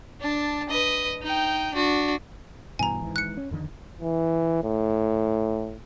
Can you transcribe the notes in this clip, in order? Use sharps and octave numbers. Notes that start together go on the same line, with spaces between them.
D4 A5
B4 D#5
D#4 G5
D4 F#4
G2 B2 E3 G#5 A#5
G#1 G#2 E3
F#6 C#7
C#4
F2 D3 D#3
E3
A2